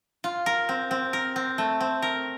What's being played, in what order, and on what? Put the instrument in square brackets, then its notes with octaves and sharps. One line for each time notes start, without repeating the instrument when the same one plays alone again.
[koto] F4
A#4
C4
C4
A#4
C4
A3
C4
A#4